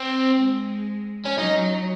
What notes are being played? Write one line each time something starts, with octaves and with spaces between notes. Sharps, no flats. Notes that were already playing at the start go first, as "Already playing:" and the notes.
Already playing: C4
G#3
C#4
F#3 D#4